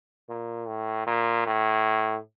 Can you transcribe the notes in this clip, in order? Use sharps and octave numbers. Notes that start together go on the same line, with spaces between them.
A#2
A2
A#2
A2